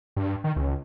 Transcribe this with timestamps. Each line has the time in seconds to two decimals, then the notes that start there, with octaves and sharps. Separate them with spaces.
0.17 G2
0.44 D#3
0.56 C#2